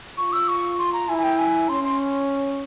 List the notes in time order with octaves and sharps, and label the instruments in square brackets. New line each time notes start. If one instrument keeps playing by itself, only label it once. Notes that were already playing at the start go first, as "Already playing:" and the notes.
[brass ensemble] F4 [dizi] C#6
[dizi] E6
C#6
C6
A#5
[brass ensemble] E4 [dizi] G#5
[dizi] G#5
G5
G#5
[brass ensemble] C#4 [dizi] C6
[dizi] C6